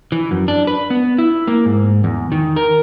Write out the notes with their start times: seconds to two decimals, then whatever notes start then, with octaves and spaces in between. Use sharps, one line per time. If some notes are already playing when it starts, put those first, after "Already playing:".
0.12 E3
0.31 F#2
0.48 D4
0.67 B4
0.90 B3
1.18 E4
1.48 A#3
1.65 G#2
2.04 E2
2.32 D#3
2.56 A#4